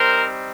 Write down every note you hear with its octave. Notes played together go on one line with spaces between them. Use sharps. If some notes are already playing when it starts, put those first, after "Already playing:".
Already playing: G3 C4 D#4 A#4 C5